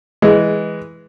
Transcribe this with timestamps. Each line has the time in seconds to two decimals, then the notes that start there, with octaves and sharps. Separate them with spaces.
0.22 E3 G#3